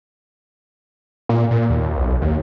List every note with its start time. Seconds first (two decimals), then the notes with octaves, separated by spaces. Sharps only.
1.29 A#2
1.51 A#2
1.70 D#2
1.97 B1
2.22 D#2